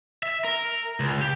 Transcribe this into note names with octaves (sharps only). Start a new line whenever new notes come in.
E5
A#4
C#2
G4